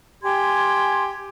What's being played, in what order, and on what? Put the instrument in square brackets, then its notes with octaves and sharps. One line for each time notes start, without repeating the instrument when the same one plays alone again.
[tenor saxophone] G4 [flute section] G#5 C6 G#6